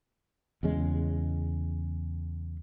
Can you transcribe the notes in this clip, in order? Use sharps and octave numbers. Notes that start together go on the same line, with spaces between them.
E2 C#3 G#3